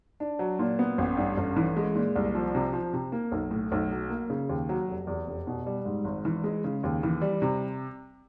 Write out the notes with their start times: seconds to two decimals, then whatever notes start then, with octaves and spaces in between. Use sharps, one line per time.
0.20 D4
0.39 F#3
0.59 A#2
0.79 B3
0.98 A1
1.17 G2
1.37 A1
1.56 E3
1.77 G#3
1.95 A#2
2.16 C2
2.35 F3
2.55 C3
2.73 F3
2.93 C3
3.12 A#3
3.32 B1
3.51 A2
3.72 B1
3.91 F#3
4.10 A#3
4.30 C#3
4.49 D#2
4.69 F#3
4.88 F1
5.07 E2
5.28 F1
5.47 B2
5.66 G3
5.85 G#2
6.05 G#1
6.25 E3
6.44 G#3
6.64 C#3
6.84 D#2
7.03 E3
7.22 G3
7.42 C3